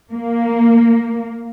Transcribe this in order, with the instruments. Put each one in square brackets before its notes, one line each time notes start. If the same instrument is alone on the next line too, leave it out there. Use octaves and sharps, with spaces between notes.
[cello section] A#3